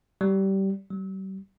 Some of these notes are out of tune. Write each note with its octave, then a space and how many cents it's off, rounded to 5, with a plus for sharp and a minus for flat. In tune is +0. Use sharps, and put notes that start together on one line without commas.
G3 -20
G3 -40